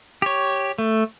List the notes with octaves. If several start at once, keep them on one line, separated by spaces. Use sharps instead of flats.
G4 C#5
A3